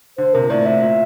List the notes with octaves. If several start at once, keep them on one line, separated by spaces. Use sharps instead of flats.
D3 C5
C3 A#4
A#2
A2 D5
E5
A#2